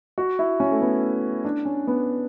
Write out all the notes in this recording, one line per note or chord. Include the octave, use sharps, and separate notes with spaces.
F#4
E4
C#4
A3
B3
D4
C#4
B3